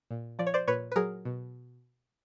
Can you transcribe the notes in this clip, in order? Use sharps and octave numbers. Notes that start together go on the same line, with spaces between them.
A#2
F3 D5
C#5
C5 D5
A#2 B4 C#5
B4
F#3 G#4 A#4
B2